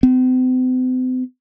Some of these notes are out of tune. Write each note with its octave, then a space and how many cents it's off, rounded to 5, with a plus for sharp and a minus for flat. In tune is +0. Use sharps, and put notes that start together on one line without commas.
C4 -45